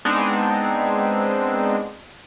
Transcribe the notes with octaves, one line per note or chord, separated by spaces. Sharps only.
G#3 B3 C4 D4 D#4